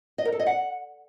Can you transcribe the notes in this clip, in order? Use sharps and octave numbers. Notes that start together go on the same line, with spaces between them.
D#5
A#4
A4
D#5
F#5